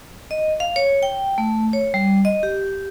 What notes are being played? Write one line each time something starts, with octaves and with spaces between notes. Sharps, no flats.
D#5
F5
C#5
G5
A3
C#5
G3
D#5
G4